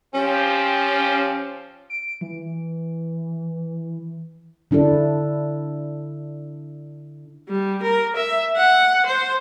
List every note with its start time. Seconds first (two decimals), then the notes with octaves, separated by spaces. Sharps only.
0.14 F3 C4 C#4 G4
1.90 D7
2.21 E3
4.71 D3 D4 E4 A4
7.48 G3
7.82 A#4
8.16 E5
8.56 F#5
9.05 C5